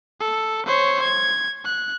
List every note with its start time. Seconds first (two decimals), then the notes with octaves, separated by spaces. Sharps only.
0.20 A4
0.67 C5 C#5
1.02 G#6
1.64 F#6